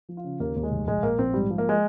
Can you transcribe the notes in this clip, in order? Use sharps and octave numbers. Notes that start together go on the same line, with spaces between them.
F3
F4
C#3
D#2 A#3
D#2
G#3
F1
A#1 G#3
A#1 A#3
A#1 C4
G#2 G3
F3
A#3
G#3